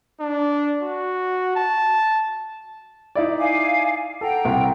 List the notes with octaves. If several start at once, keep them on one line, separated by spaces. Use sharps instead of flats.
D4
F#4
A5
D#4 E4 D5
F5 G#5 D6
A4 F#5 G5 A#5
C2